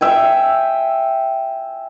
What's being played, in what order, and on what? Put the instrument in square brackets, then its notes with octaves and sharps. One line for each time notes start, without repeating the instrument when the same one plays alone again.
[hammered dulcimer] E5 G5 G#5